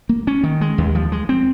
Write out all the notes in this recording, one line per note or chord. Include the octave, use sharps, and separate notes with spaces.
A#3
C#4
D#3
G#3
D#2
F3
G#3
C4